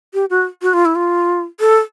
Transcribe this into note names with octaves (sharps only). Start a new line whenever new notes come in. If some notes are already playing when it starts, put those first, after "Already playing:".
G4
F#4
F#4
F4
E4
F4
A4